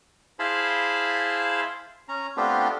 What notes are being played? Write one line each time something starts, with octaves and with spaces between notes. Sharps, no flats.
E4 G#4 C5 F5 A5 B5
C#4 A#5
A3 B3 C4 D4 F4 G4